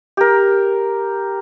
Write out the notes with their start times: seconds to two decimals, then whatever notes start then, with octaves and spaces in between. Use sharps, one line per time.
0.17 G4 A#4